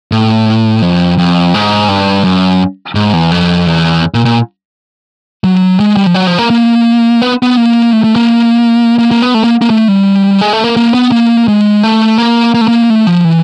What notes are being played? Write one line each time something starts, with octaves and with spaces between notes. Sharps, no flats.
A2
F2
F2
G#2
G2
F#2
G#2
E2
F2
E2
A#2
A#2
F#3
G#3
G3
F3
F#3
F3
A#3
A#3
B3
B3
A#3
A3
A3
A#3
A#3
A#3
B3
A3
A#3
A#3
A3
G3
G#3
A3
A#3
A#3
B3
A#3
G#3
A3
A#3
A#3
A3
A#3
A3
F3
E3